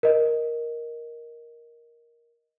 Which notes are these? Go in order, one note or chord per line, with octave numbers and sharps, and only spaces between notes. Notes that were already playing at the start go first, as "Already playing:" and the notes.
A#4 D#5